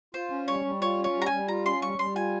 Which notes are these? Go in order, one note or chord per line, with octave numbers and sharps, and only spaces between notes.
F4 C5
C#4
G3 C#5
G3
F4 C#5
C#4
C#5
G3
A#5
G#5
G3
F4 A#5
C#4 C6
G3 C#6
G3 C6
F4 G#5